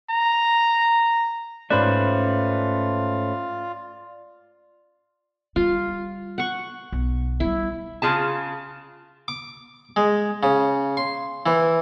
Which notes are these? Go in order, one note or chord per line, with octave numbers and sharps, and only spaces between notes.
A#5
G#2 A3 C#4 F4 B4 C5 D5 F#6
G3 F4
F#5 C#6
B1
G3 B3 E4
C#3 F4 G#4 A5
D6
G#3
C#3
C6
E3